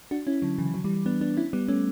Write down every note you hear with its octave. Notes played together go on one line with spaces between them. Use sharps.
D4 F#4
C#4 E4
D3 F#3
C#3 E3
D3 F#3
E3 G3
B3 D4
B3 D4
C#4 E4
G3 B3
A3 C#4